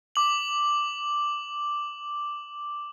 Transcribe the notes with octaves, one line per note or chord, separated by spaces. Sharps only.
D6 F#7